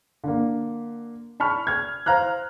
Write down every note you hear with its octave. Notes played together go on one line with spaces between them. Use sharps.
D3 A#3
A5 B5 C#6 F6
F6 G#6
C5 F5 A#5 F6 F#6